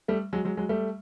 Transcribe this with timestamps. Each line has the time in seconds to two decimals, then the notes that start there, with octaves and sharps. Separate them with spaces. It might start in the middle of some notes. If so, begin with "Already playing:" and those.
0.08 G3 A3
0.33 F#3 G#3
0.45 F#3 G#3
0.57 F#3 G#3
0.69 G3 A3